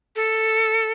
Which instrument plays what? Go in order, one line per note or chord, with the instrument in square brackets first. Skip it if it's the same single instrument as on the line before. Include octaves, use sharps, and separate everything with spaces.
[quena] A4